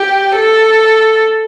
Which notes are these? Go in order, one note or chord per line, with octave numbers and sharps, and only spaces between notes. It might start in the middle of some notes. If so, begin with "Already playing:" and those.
Already playing: G4
A4